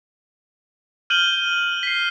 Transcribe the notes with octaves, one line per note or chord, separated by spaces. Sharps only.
F6 G6 D#7 F#7 G7
B6 C7